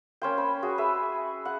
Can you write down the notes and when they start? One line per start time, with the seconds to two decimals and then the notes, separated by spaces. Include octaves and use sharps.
0.22 A#3 C#4 C5 G5
0.38 B5
0.62 F#4 G#4
0.78 G#4 B4 E5
1.45 F#5